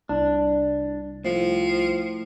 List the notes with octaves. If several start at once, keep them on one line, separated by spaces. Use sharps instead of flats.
C2 D4
A2 F3